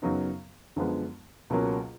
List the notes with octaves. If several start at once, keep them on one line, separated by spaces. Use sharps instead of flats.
F#2 C#3 F#3 B3 D#4
F#2 D3 F3 G#3 B3
C#2 B2 F#3 A#3 C#4